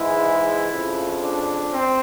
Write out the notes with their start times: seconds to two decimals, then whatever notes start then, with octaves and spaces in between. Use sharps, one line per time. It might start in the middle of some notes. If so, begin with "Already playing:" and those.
Already playing: G#2 E3 G#3 E4
0.69 F2 C#3 F3
1.21 D4
1.72 C4